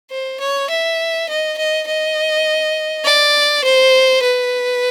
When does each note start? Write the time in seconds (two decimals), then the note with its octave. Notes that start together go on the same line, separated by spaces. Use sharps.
0.11 C5
0.40 C#5
0.70 E5
1.29 D#5
1.58 D#5
1.87 D#5
3.04 D5
3.64 C5
4.22 B4